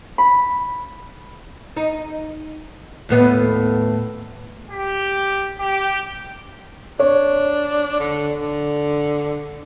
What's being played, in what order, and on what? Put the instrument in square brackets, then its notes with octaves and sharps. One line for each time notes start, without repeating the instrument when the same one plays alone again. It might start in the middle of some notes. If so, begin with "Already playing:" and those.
[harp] B5
[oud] D#4
D#2 A2 B3
[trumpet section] G4
G4
[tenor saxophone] D4 [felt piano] C#5
[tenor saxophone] D3
D3